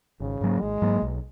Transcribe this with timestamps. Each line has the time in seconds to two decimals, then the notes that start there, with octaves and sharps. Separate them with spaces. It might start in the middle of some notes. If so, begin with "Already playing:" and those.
0.20 G#1 C#3
0.41 G#2 F#3 A#3
0.61 G#1 G#3
0.82 G#2 F#3 A#3
1.02 B1